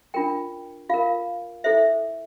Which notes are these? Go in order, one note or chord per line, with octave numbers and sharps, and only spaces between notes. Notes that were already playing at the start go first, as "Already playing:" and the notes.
D4 F4 A#4 G5
F4 A#4 F5
E4 A4 C5 E5